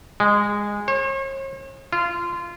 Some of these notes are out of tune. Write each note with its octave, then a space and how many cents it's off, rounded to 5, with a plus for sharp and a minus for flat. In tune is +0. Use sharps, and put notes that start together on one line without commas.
G#3 -15
C#5 -45
F4 -20